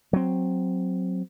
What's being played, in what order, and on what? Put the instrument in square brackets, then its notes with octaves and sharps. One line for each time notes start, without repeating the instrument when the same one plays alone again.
[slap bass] F#3 C4